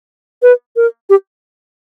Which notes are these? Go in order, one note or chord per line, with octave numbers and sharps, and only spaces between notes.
B4
A#4
G4